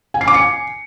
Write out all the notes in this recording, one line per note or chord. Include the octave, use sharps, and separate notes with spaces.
G#5
C7
D6
C#7
G#5